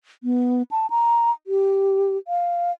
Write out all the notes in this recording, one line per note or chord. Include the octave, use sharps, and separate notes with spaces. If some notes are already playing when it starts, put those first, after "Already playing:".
B3
A5
A#5
G4
F5